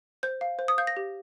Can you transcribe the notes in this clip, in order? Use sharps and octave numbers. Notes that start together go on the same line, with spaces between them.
C5 G6
F5
C5
D#6
F5 G6
A#6
G4